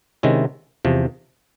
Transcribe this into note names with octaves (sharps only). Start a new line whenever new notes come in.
C3 D#3 G#3 C#4 E4
E2 C3 F3